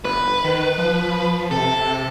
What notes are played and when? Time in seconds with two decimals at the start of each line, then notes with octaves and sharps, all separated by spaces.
0.05 G1 B4
0.44 D#3
0.78 F3
1.51 C3 A4